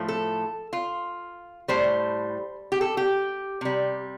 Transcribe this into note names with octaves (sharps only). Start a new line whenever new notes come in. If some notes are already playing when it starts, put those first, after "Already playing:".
Already playing: A2 F3 A3
A4
F4
A2 G3 C5
G4
A4
G4
C3 G3